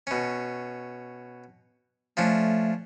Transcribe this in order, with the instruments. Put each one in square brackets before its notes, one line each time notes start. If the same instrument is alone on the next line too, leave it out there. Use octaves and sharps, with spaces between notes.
[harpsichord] B2 C#4
[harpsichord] F3 C#4 D4 [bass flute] A3